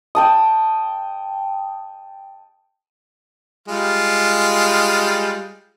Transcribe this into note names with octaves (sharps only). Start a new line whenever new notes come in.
G5 A5 D#6
G3 G#3 F4